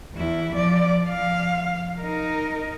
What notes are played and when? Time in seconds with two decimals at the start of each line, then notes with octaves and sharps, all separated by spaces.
0.15 E2 E4
0.54 F3 D5
1.06 F3 F5
2.00 D#4 A#4